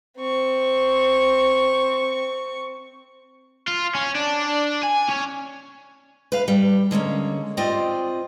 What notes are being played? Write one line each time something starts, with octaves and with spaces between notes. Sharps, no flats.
C4 C#6
F4
C#4
D4
G#5
C#4
B4 F5
G3
D3 G#3 A#3 C#4
C4 F4 G4 C5 D5 D#5